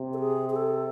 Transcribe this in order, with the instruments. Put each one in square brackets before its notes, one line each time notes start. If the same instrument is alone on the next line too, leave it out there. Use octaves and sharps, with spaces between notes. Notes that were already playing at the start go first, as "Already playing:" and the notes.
Already playing: [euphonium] C3
[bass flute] A4
G#4
G#4
A4